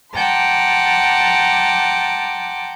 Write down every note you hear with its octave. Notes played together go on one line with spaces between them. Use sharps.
F#5 G5 A5 A#5 C6 D6